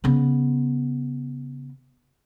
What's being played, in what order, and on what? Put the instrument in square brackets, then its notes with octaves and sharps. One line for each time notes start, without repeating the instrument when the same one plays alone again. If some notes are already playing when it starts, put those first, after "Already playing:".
[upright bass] C#3 B3